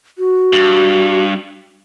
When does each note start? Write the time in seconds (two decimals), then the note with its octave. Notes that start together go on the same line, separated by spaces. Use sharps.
0.18 F#4
0.53 G2